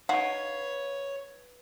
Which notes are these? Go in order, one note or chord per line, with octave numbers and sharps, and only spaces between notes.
D#4 F#4 B4 C#5 F5